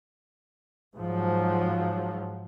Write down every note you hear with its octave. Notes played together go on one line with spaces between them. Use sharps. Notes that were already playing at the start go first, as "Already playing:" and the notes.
G#2 F3 F#3